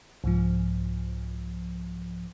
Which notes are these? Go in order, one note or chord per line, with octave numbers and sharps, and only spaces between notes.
C2 G#2 F3